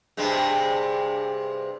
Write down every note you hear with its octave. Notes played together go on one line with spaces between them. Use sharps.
G2 C3 G#3